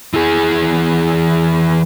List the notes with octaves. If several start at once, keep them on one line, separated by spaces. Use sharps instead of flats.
E3 G#4